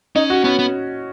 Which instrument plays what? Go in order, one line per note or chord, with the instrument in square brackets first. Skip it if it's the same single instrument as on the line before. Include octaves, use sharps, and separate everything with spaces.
[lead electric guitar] C#4 [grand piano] D#4
[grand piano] F#4
[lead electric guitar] B3 [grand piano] C#4
[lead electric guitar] B3